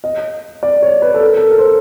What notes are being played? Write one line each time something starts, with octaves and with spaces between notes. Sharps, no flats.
D#5
D5
C#5
B4
A4
A#4
A4
A#4
C5